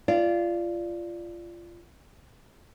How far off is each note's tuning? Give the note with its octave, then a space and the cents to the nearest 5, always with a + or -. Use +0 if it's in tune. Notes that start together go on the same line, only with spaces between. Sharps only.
F4 -20 D5 +0